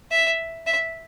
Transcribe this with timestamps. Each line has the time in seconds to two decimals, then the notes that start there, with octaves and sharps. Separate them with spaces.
0.11 E5
0.67 E5